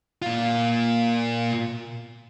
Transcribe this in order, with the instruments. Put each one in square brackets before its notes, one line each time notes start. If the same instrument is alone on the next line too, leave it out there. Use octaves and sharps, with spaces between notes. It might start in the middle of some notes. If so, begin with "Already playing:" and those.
[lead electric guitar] A#2 F4